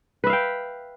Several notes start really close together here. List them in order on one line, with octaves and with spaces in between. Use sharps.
B4 E5 F5 G5